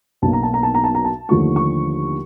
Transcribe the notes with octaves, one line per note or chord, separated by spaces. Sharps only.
B1 B2 F#3 A#3 A5
A#5
A5
A#5
A5
A#5
A5
A#5
A5
D#2 D3 F3 A3 C#6
C#6